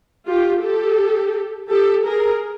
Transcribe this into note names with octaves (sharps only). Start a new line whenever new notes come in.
F4 G4
G4 A4
G4 A4
G#4 A#4